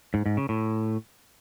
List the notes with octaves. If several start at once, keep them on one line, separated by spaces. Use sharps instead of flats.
G#2
G#2
C#3
A2